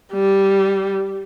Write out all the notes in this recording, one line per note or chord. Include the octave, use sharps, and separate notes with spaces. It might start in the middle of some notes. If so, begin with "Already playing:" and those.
G3